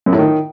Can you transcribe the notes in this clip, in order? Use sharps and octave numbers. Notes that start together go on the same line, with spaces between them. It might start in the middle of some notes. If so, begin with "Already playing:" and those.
F#2
A2
D#3